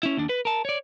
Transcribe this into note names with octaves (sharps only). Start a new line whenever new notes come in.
C#4 E4
D#2 D4
B4
A#4 A5
C#5 D5